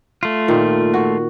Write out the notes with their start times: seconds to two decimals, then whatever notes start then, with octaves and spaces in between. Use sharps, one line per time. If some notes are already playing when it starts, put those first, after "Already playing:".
0.23 A3 F4
0.48 A#2 D#3
0.94 F#4